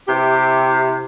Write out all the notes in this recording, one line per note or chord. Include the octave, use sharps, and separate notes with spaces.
C3 E4 G4